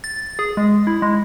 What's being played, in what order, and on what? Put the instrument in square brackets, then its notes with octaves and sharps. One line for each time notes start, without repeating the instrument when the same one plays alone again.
[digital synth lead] A6
G#4
G#3
E4
G#3